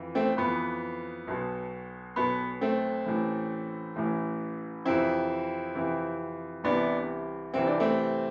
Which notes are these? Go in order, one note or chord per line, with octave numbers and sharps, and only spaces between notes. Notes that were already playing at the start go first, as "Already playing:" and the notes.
Already playing: F2 E3
A3 C4
F2 E3 B3
B1 B2
B1 B2 B3
A3 C4
A1 A2 E3
A1 A2 E3
F2 C3 E3 C4 E4
F2 C3 E3
C2 C3 E3 B3 D4
C2 C3 E3 C4
D4
A3 C4